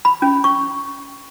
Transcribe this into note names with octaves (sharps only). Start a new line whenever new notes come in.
B5
C#4
C#6